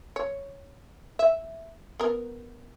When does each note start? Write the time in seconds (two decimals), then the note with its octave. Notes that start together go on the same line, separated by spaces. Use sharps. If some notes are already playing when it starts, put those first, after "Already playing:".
0.16 C#5
1.19 E5
2.00 B3 A#4